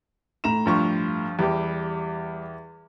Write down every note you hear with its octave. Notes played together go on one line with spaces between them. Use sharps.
A2 A#5 E7
G2 F3 C#6
E2 G3 G4